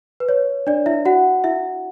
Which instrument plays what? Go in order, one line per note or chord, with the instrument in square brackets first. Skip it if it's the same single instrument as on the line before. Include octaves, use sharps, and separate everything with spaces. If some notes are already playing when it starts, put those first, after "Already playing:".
[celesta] B4
C#5
D4 D5
E4 E5
F#4 F#5
E4 E5